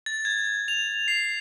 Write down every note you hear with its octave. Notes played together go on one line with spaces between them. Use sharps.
A6
G#6
F7
C7